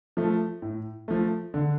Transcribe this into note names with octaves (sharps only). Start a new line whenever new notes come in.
F3 A3
A2
F3 A3
D3